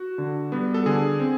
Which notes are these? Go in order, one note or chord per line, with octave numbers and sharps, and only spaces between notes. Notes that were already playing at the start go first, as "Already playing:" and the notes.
Already playing: F#4
D3
G3 B3
A4
D3 G#4
C4